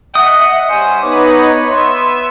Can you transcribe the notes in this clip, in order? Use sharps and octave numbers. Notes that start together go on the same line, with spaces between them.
D#5 E5 F#5 D#6
G3 C#4 C5 G#5
B3 D#4 B4 C#5 D6
D#5
B3 E5 C6